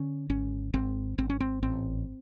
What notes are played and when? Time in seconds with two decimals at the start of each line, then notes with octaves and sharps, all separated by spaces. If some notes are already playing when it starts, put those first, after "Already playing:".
Already playing: D3 C#4
0.30 G#1 C#4
0.74 G#1 C4
1.18 G#1 C4
1.30 C#4
1.40 C4
1.63 A1 C4